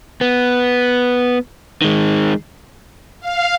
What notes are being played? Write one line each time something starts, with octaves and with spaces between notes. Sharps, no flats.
B3
D#3 G#3
F5